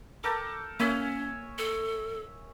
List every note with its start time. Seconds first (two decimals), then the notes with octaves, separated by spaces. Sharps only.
0.24 A4 A#4 G5 D6
0.80 A#3 C#4 C#5 E5 G#5
1.58 A4